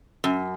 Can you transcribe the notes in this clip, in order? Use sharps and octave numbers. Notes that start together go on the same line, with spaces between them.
F#2